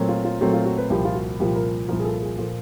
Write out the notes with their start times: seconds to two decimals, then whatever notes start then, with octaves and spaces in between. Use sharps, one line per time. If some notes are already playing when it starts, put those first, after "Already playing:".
Already playing: A#2 F#3 A3 C4
0.09 F4
0.25 F4
0.41 A#2 F#3 A3 C4 F#4
0.53 F4
0.66 F#4
0.78 B4
0.90 C2 A#2 F3 G4
1.05 F4
1.15 F#4
1.40 C2 A#2 F3 G4
1.56 A#4
1.88 C2 A#2 F3 A#4
2.00 G#4
2.05 A4
2.21 G#4
2.38 A#2 F3 A4